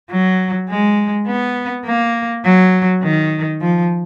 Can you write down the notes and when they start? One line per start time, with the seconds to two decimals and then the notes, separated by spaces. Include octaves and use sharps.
0.11 F#3
0.70 G#3
1.28 B3
1.86 A#3
2.45 F#3
3.03 D#3
3.61 F3